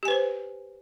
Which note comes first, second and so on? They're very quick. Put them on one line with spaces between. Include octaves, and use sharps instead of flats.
G4 G#5 B4 C5